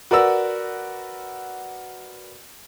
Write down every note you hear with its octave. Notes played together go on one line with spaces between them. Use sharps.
F#4 A#4 B4 D5 F#5 E6